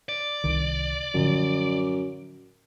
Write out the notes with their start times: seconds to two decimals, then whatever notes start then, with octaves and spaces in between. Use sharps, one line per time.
0.09 D5
0.44 C2 D#3
1.14 F#2 A2 D3 F3